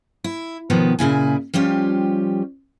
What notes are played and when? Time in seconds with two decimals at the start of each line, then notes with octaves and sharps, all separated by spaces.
0.24 E4
0.70 B2 D#3 F3 B3
0.99 A#2 C#3 E4 G#5
1.54 F3 G3 C#4 F4 G4